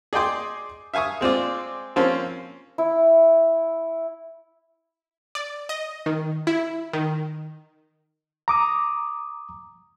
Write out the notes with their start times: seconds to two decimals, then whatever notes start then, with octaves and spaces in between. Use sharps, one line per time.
0.13 G#4 D5 D#5 G5 C6 D6
0.94 E5 F5 G#5 C#6 D#6
1.21 G#3 C4 F4 D5
1.96 F3 A#3 C4 C#4
2.78 E4
5.35 D5
5.69 D#5
6.06 D#3
6.47 E4
6.93 D#3
8.48 A#5 D6 D#6